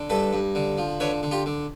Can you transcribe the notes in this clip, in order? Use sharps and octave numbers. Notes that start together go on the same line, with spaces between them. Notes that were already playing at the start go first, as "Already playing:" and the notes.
Already playing: D3
G2 A4 B4
G2
D3
F3
D3 B4 C#5
D3
F4 G4
D3